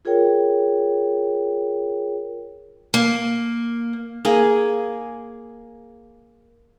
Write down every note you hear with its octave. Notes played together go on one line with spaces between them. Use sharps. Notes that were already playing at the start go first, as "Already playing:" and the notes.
F4 G#4 A#4 C#5 G5
A#3
A#3 G#4